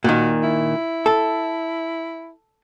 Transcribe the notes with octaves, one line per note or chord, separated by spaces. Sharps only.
A#2 D#3 F#4
E4
A4